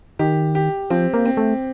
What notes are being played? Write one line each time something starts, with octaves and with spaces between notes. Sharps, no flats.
D#3 G4
G4
F3 C4
A#3
C4
A3